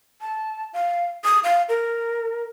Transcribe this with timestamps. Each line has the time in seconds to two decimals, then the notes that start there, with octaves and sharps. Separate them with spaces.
0.21 A5
0.73 F5
1.24 D#6
1.44 F5
1.69 A#4